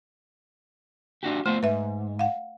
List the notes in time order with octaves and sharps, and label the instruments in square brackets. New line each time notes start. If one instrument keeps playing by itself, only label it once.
[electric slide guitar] D4 F#4 G4
[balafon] A3 [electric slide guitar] B3 F4 C5
[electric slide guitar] G#2 [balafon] B4 E5
[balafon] F5 F#5